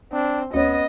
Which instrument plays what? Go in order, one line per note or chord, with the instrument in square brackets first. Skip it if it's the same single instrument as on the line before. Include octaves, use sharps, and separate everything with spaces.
[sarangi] C4 [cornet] D4
[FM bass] D2 [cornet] B3 [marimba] C#4 C#5 [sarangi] D#5